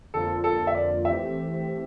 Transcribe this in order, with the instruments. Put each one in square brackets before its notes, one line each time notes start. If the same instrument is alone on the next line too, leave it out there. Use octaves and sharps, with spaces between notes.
[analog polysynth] F2 D3 F3 A#3 F4 [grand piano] A4
[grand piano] A4
E5
D5
[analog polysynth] E3 A3 C4 G4 [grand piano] E5